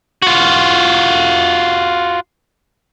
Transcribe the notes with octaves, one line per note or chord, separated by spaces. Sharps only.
F4 F#4